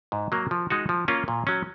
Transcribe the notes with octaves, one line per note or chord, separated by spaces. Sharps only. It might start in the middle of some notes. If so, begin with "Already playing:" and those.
G#2
F#3 A#3
F3
G#3 D#4 F#4
F3
A#3 C#4 F4
A#2
F#3 C#4